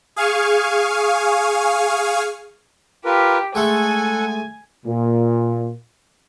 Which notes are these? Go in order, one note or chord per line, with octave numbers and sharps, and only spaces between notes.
G#4 F5 G#5 C#6
F4 G4 A#4 B4
G#3 A3 A4 F#5 G#5
A#2